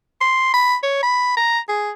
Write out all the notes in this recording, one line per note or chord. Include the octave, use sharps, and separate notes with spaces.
C6
B5
C#5
B5
A#5
G#4